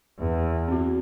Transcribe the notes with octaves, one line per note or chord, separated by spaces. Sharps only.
E2
C4 F#4